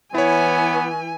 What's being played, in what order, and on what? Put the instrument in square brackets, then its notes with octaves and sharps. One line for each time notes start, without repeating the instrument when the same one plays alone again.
[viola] E3 G#5 [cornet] B3 [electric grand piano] E4 C#5